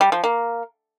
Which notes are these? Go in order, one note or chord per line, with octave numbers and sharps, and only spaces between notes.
G3
F3
A#3